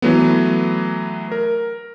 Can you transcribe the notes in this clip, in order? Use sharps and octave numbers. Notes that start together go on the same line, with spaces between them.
E3 F#3 A3 B3
A#4